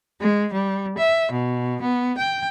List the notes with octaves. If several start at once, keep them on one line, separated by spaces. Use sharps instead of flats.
G#3
G3
E5
B2
B3
G5